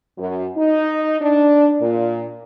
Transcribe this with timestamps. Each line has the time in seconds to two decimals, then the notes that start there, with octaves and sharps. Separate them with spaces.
0.17 F#2
0.56 D#4
1.21 D4
1.81 A#2